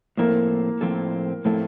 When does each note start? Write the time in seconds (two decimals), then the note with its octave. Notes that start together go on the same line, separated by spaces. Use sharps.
0.17 A2 F3 A#3 C4 E4 A4
0.81 A2 F3 C4 E4 A4
1.45 A2 F3 A3 C4 E4 A4